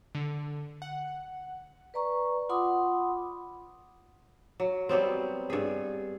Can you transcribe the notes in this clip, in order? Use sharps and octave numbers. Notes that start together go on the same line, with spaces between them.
D3
F#5
B4 D5 A#5 C#6
F4 F#5 B5 C6 D6 D#6
F#3
F#3 G3 B3 C4
G2 G#4